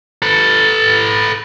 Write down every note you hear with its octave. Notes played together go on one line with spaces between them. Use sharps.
A4 B4